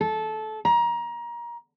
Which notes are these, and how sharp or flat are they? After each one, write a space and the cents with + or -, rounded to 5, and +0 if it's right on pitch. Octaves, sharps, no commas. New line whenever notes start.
A4 -20
A#5 +25